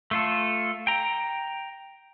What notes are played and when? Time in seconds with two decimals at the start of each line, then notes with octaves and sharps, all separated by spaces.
0.11 A3 F4 A4
0.87 G5 A#5